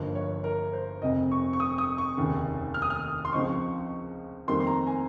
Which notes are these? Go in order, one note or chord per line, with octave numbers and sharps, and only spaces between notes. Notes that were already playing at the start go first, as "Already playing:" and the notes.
Already playing: G1 G2 F3 A#3 D#4
C#5
A#4
C5
F1 F2 C3 D#5
C#6
C#6
D#6
D#6
C#6
F1 D#2 C#3
F6
D#6
F6
C6
C#2 C#3 F3 C4 D#4 C#6
F2 D#3 G3 A#3 C6
C6
A#5
G#5